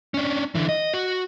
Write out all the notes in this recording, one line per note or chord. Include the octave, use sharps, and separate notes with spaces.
C#4 D4
D3 E3
D#5
F#4